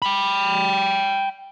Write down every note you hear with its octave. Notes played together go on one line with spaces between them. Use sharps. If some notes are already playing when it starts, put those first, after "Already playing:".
G5 B5